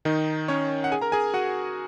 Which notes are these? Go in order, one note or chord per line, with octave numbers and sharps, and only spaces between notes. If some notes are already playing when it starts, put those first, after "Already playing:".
D#3 D#4
C#4 C#5
F#5
G#4 G#5
A#4 A#5
G#4 G#5
F#4 F#5